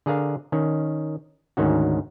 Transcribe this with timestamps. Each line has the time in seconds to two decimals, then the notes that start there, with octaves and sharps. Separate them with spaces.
0.06 D3 G#4 A#4 F5
0.52 D#3 C#4
1.57 D2 G#2 D#3 C#4 F#4